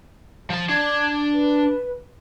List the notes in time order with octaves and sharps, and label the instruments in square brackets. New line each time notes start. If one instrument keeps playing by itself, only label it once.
[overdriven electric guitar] F3 A5
[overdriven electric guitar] D4 [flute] G#6
[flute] B4